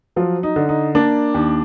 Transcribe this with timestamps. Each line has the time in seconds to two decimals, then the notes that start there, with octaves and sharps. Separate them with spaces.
0.16 F3 F#3 F4
0.43 D#4
0.56 D3
0.69 D#4
0.95 A#3 D4 D5
1.34 D#2